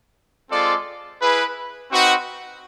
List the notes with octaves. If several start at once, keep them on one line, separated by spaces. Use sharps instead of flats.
G#3 C4 F4 A4 D5
E4 G#4 B4
C4 D#4 F#4 B4